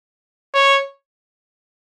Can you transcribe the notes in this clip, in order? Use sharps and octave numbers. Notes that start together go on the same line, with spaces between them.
C#5